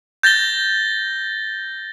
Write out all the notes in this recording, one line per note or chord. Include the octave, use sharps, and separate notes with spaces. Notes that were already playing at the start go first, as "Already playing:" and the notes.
G6 A6 A#6 G7